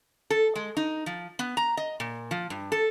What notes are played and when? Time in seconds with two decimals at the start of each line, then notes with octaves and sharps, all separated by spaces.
0.30 A4
0.56 G#3
0.77 D#4
1.06 F3
1.39 B3
1.57 A#5
1.77 D#5
2.00 A#2
2.31 F3
2.50 G2
2.72 A4